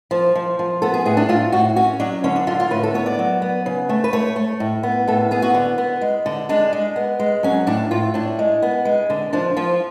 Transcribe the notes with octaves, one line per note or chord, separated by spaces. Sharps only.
F3
F3
F3
B3 A4
G#4
A2 G#4
D4
A2 F4
A2 F#4
C#4 F#4
F#3 D4
D3 C#4
D4
D3 F4
F4
A2 B4
A4
B3 C#5
D5
F#3
B3
C#3
A3
B4
A3 C#5
A3
A2
B3
A2 A4
B3 G#4
F#4
D3
B3
G#3
D3
G#3 D4
G#3
B3
G#3
F#3 C#4
A2 D4
A2 F4
A2 D4
G#3
B3
G#3
D3
F3 D4
F3 F4